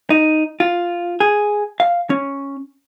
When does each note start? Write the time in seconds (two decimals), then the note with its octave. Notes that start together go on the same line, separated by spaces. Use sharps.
0.10 D#4
0.60 F4
1.20 G#4
1.80 F5
2.10 C#4